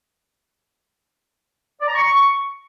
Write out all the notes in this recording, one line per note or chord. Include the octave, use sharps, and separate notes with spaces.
D5
A#5
C#6